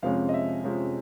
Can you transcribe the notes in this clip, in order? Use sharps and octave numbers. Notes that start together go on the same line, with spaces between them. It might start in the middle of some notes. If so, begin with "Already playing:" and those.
F2 C3 F3 G#3 C#4 F5
D#5
E5
F2 C3 F3 G#3 C#4